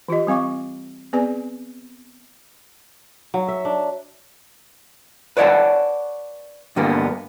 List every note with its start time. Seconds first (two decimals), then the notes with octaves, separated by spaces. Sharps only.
0.09 E3 F4 G4 D#5
0.27 G3 C4 F5 C#6 D6
1.13 B3 C4 G#4 B4 D5 G#5
3.34 F#3
3.48 E5
3.65 D4
5.37 B4 C#5 D5 E5 F#5 A5
6.76 G2 D3 G3 A#3 B3